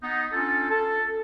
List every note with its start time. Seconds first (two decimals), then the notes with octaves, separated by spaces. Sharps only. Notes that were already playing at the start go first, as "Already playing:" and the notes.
0.03 B3 D#4
0.32 C#4 D4 F4 A4
0.70 A4 A5